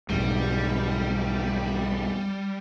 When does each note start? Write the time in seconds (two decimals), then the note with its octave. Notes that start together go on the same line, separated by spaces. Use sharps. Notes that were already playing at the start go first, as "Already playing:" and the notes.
0.10 B1 F2 G#2 G3